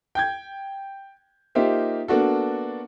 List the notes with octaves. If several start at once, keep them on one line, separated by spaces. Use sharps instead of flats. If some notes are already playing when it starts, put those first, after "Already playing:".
G5 G6 G#6
A#3 D#4 F4 G4 C5 E5
A#3 B3 D4 F#4 A4